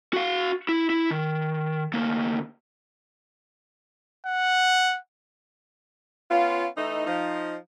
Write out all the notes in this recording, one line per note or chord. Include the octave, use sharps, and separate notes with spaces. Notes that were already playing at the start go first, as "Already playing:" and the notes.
F#4 F5
E4
E4
D#3
D2 A#3
F#5
B3 C#4 F4
E3 A3 D#4
F3 D#4